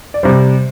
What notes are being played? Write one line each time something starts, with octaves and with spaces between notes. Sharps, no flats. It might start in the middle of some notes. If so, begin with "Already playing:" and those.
D5
C3 G3 C5